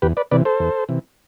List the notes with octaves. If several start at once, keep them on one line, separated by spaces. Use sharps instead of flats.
E2 G4 B4
B4 D5
C3 E3 B4 D5
A4 C5
E2
C3 E3